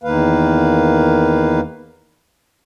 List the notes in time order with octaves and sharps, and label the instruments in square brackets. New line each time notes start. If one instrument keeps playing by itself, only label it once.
[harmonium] E2 D#3 A#3 B4 F5